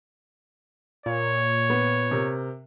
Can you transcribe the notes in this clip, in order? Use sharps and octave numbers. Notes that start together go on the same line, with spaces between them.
A#2 C#5
B3
C3 A#4